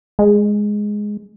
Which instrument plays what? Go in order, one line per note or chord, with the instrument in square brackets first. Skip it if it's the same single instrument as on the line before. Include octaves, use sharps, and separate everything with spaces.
[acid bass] G#3